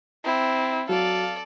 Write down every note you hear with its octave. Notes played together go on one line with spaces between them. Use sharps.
C4 E4
F#3 A4 D5 F5